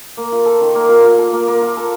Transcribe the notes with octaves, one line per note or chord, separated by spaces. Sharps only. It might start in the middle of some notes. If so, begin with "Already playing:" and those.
A#3
F4
A4
D#3
A#3
F4
F4
A4
A#3
A#3
F4
A4